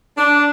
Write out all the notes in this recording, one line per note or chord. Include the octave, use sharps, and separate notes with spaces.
D4